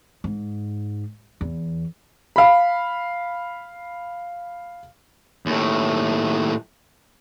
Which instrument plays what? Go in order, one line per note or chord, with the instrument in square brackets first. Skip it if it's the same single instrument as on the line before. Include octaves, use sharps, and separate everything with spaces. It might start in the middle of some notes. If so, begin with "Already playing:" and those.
[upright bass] G#2
E2
[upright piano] F5 B5
[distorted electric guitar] D#2 A2